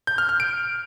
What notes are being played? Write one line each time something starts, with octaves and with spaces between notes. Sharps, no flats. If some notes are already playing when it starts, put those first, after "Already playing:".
G6
F6
F6
D7